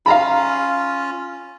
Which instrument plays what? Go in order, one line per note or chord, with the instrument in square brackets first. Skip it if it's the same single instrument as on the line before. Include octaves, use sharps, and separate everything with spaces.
[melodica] C#4 F4 [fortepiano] F5 A#5 B5